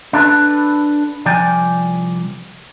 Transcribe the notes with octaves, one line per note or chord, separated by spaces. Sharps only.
D4 A4 B4
C2 F3 D5 G5 G#5